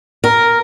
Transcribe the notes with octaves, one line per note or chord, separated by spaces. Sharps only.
A#4